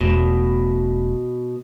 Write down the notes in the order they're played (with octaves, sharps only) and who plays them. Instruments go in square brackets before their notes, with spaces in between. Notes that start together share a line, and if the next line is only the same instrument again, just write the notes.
[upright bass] E1 A3 [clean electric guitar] B2